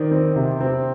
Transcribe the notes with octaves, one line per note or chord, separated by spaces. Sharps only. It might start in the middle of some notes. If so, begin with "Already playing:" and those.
Already playing: D#3 C5 D5
C4
C3
C4